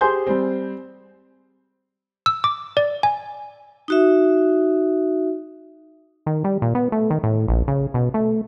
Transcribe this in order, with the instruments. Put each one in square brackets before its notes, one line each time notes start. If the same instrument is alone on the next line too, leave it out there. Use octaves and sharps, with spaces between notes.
[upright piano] G4 G#4 C5 C6 G6
G3 C4
[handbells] E6
D6
D5
G#5
[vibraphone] D#4 F#4 E5
[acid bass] D#3
G3
A#2
B3
A3
D#3
A2
A#1
C#3
B2
A3